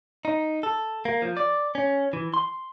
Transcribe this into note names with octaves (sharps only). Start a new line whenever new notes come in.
D#4
A4
A#3
F3
D5
C#4
E3
C6